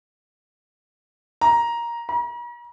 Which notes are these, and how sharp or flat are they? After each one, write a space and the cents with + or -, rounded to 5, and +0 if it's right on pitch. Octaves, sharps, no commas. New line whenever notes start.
A#5 +10
A#5 +45